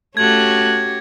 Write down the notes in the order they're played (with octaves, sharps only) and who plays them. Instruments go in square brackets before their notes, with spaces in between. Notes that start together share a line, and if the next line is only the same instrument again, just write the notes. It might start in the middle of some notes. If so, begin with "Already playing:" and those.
[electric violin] A3 F#6 [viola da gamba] C#4 F#4 G4 [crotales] G#6